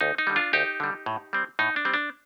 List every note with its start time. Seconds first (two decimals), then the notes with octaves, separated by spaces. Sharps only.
0.01 D2 D#4
0.18 D#4
0.27 D3 G3
0.36 D4 F4
0.53 D2 D#4 G4
0.80 D3 G3
1.06 A2
1.33 G3 C4
1.59 A2 D#4
1.76 D4
1.85 G3 C4
1.94 D4